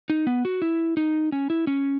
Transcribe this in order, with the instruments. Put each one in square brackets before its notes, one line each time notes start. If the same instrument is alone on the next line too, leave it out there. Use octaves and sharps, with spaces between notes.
[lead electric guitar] D#4
B3
F#4
E4
D#4
C#4
E4
C#4